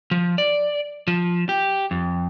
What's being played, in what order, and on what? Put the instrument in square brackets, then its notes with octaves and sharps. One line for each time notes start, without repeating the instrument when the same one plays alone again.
[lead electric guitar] F3
D5
F3
G4
F2